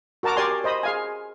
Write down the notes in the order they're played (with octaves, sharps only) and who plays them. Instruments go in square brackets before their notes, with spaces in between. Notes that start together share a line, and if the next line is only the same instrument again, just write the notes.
[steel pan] F#4 A#4 A5 A#5 D6
G4 A#4 D5 G#5 C6
C5 D#5 B5 D#6
G#4 F5 G#5